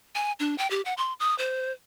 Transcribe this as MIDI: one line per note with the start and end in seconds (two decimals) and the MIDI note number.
0.15 0.32 80
0.40 0.55 62
0.58 0.69 79
0.71 0.81 67
0.85 0.94 78
0.97 1.13 84
1.20 1.36 87
1.38 1.72 72